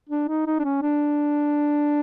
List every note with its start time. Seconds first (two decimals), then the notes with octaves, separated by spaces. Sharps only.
0.09 D4
0.28 D#4
0.46 D#4
0.59 D4
0.64 C#4
0.82 D4